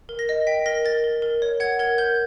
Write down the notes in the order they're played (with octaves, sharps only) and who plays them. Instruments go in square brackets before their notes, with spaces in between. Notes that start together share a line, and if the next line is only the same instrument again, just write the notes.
[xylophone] A#4
A#6
D#5
G5 B6
A#4 A#6
A#4 A6
A#4
A#4
C#5
F#5 G#6
A#4 G#6
A#4 G6